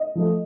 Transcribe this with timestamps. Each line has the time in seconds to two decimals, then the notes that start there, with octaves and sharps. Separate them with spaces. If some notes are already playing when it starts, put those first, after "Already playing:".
Already playing: D#5
0.15 F3 A3